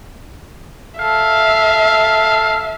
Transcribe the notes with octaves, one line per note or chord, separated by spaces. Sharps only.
A4 E5 F5